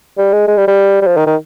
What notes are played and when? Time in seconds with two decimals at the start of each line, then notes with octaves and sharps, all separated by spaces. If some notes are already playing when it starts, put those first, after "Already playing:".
0.18 G3
0.33 G#3
0.48 G#3
0.57 G3
0.68 G3
1.02 G3
1.06 F3
1.17 D#3
1.27 D#3